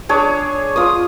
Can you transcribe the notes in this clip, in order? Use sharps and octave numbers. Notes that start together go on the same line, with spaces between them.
D4 G#4 C#5
F4 D6 D#6